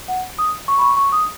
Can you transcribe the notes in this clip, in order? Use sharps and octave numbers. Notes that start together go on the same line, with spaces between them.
F#5
D#6
C#6
B5
C#6
C#6
D#6